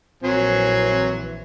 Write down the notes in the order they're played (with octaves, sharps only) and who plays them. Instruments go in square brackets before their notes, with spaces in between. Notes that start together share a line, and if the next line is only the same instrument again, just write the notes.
[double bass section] A#1 E3 [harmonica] F#3 [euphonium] C4 [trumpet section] A#4 G#5 C6